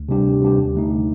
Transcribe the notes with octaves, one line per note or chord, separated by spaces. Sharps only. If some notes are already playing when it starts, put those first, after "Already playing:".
Already playing: D2
C3 G3 D4 G4
D2
C3 G3 D4 G4
D#2
D3 A3 D#4